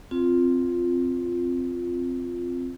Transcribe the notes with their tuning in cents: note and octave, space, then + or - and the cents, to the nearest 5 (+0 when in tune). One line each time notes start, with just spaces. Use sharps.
C4 +0 F4 +0